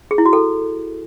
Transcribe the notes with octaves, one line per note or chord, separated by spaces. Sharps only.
G#4
E4
F#4
A4